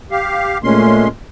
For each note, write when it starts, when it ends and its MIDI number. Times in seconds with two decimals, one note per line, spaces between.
0.11 0.58 67
0.11 0.58 77
0.63 1.06 46
0.63 1.08 56
0.63 1.06 57
0.63 1.08 61
0.63 1.08 84